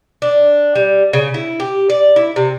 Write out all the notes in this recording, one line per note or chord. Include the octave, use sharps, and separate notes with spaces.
D4
G3
C#3
E4
G4
D5
E4
C3